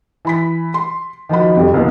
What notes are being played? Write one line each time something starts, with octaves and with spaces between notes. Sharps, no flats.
E3 B5 B6
C6
D#3 F3 F#4 B5
F2 C3 G3
C#2 B2 E3 A#3 B3